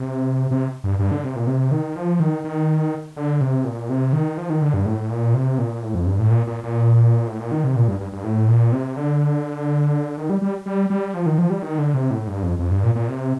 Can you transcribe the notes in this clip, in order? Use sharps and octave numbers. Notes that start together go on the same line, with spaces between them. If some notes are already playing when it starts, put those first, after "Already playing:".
Already playing: C3
C3
G2
G2
D3
C3
A#2
C3
D#3
F3
D#3
D#3
D3
C3
A#2
C3
D#3
F3
D#3
D3
G2
A2
A#2
C3
A#2
A2
F2
G2
A2
A#2
A#2
A#2
A2
A#2
D#3
C3
A#2
G2
G2
G2
A2
A#2
C3
D3
D#3
G3
G3
G3
G3
F3
D#3
F3
G3
D#3
D3
C3
A2
G2
F2
F2
G2
A#2
A#2
C3